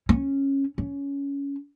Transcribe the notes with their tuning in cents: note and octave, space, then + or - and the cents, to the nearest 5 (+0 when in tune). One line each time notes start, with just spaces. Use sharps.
C#4 -15
C#4 +15